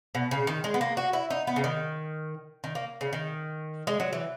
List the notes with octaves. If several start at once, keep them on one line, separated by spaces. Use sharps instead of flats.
B2
C#3
D#3
G#3
B3
A#3
F#4
E4
D#4
B3
C#3
D#3
D#3
A#3
C#3
D#3
G#3
F#3
E3